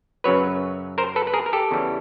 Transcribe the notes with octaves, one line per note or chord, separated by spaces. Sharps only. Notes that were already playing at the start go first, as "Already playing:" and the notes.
F#2 C#3 F#3 B4 C#5
A#4 C5
A4 B4
B4
G#4 A#4
A#4
G4 A4
E2 C#3 E3 G3